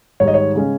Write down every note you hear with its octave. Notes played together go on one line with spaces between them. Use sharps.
G#2 D#3 G3 C#5
D#5
C#5
C#3 G#3 C#4